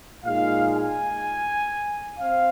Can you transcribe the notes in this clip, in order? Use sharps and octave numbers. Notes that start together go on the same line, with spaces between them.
A#2 G#3 D#4 F5
G#5
C4 F5